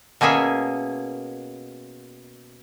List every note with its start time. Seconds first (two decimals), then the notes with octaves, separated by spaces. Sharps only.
0.21 B2 A#3 C#4 G#4 E5